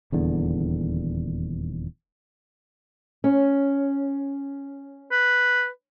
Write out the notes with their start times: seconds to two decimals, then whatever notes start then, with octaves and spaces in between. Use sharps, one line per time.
0.12 D#1 E2 D3
3.24 C#4
5.12 B4